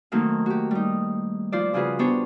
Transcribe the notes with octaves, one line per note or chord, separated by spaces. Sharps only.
D#3 F#3 A3 A#3 C4 D#4
F#4 G4
G3 D#4
F3 F4 C5 D5
C#3 F3 F4 F#4 G#4 B4
B3 D4 G4 C5 C#5